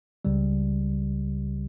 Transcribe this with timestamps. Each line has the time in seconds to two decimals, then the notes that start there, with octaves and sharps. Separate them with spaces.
0.25 C#2 C#3 G3